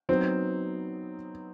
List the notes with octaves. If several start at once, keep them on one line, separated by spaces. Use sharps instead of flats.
F#3 B3 C4 D#4